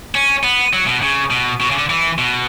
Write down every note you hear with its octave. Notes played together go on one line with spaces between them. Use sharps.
C#4
B3
F#3
B2
C#3
B2
B2
C#3
D3
E3
B2